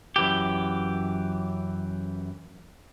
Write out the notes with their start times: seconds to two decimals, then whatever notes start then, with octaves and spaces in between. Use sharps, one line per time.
0.16 F#2 E3 G4